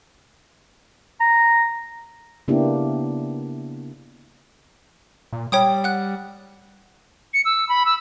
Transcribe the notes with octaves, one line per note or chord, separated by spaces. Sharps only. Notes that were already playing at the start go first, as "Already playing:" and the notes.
A#5
C#3 A#3 B3 D4 E4 G4
A#2
G3 C#5 G5 D#6
F#5 F#6
C#7
E6
B5
E6